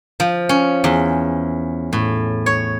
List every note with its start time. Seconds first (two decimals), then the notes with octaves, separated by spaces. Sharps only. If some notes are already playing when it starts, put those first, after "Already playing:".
0.20 F3
0.49 C#4
0.84 E2
1.93 A2
2.46 C#5